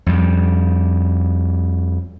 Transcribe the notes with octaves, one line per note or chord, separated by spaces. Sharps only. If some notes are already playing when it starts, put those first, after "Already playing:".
F2 G3